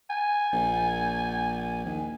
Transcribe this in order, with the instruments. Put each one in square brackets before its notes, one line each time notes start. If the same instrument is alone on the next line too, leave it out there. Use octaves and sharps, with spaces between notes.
[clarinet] G#5
[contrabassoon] A#1
D#2